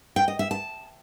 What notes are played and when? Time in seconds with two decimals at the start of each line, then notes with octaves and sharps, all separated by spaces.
0.16 G5
0.28 D#5
0.39 E5
0.51 A5